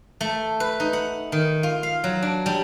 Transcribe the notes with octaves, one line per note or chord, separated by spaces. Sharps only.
A3
B4
D#4
F#5
D#3
F4
F5
F#3
D4
G3